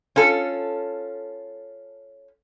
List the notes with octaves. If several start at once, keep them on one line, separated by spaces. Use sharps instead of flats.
C#4 F4 A4